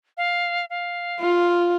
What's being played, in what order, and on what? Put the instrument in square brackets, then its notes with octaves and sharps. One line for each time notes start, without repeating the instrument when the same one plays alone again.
[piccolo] F5
F5
[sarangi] F4